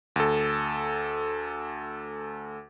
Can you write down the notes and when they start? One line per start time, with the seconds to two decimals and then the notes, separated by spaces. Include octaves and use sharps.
0.16 D2 A4